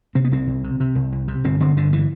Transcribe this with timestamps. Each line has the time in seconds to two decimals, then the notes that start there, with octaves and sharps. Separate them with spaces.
0.15 C3 C4
0.24 B3
0.32 C2 C4
0.47 C2
0.64 C3
0.80 C3
0.95 C2
1.12 C2
1.28 C3
1.44 G1 C4
1.60 D3 C4
1.77 G1 D3
1.93 E3